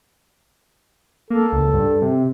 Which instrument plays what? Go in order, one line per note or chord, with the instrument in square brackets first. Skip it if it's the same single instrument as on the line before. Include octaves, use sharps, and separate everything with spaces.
[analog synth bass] A#3 [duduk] A4
[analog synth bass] C#2
G2
C3